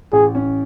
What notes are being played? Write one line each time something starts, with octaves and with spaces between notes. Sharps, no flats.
A1 G#4
C#4